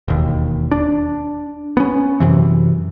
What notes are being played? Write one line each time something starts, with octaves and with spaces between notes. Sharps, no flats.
E1 D#2
D4
B3 C#4
F#2 C3 E3